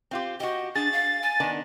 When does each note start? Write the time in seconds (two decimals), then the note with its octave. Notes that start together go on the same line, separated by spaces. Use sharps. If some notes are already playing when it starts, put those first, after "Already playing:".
0.11 C4 F4 G4
0.40 F#4 G4 D#5
0.75 D4 G#4 A6
0.92 F5
1.23 G#5
1.40 D#3 B3 D4